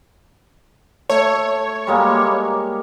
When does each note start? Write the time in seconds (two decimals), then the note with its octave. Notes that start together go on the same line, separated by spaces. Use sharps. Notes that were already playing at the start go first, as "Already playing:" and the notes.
1.10 A3 C#5
1.87 G3 G#3 A#3